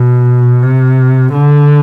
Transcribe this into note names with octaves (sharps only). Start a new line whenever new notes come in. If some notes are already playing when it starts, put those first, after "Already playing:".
Already playing: B2
C3
D3